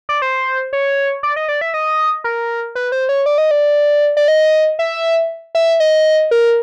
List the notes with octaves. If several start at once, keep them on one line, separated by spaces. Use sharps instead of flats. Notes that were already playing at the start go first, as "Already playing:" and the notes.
D5
C5
C#5
D5
D#5
D5
E5
D#5
A#4
B4
C5
C#5
D5
D#5
D5
D5
D#5
E5
E5
D#5
A#4